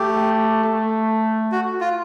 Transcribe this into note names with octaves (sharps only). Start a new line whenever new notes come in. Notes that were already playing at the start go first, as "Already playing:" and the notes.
Already playing: A3 G4
A3
F#4
F4